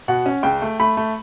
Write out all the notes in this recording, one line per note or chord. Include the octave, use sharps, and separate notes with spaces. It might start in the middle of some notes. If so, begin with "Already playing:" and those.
B2 F#5
C#4
C#2 G5
A3
A3 B5
A3